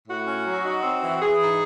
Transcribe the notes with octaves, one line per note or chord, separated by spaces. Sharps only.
A2 F#4
C#4
F#3
D#4 F#4
C4
E3
E3 G#4
D#4